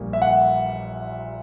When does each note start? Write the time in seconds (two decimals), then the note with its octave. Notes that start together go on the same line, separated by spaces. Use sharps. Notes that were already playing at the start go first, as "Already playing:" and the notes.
Already playing: A#1 A#2 G3
0.13 E5
0.22 F#5